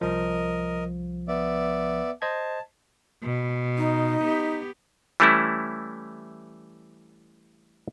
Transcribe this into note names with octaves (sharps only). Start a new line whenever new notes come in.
C2 F3 A#4 D#5
B3 D5 E5
C5 D#5 A5 G#6
B2
D#4
B3 G4
E3 G3 A3 C#4 E4